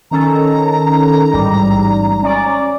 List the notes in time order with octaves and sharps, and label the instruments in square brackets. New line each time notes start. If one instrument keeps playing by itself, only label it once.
[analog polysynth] D#3 C#4 A4 [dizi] A#5
[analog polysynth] A1 G#2 G3
C#4 D5